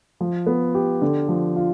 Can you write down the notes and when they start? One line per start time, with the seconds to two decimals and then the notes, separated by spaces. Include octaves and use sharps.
0.21 F3
0.47 B3
0.75 G4
1.02 D3
1.29 F3
1.56 F4